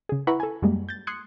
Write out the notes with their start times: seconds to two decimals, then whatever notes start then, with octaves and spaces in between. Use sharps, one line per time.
0.09 C#3 G#4
0.27 E4 B4 F#5 A#5 B5 C#6
0.40 A4 G#5
0.62 F#2 G3 G#3 A#3
0.89 G6 A6
1.07 C6 D#6 F#6 G#6 C#7